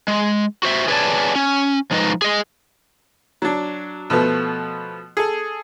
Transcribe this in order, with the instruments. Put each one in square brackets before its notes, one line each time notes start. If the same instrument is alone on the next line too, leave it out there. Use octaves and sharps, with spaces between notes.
[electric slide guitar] G#3
F#4 C5 E5
G#4 B4 C#5 D5 G#5 A5
C#4
F3 G#3 D#4 B4 D#5
G#4 D#5
[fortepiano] F#3 D4
B2 F3 A3 B3
G#4 A4